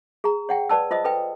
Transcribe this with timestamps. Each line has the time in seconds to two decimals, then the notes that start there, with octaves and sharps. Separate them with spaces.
0.24 G#4 A#5
0.49 C#5 F#5 G5
0.69 B4 D5 A5 E6
0.91 F4 C5 D#5 D#6
1.04 A4 B4 G5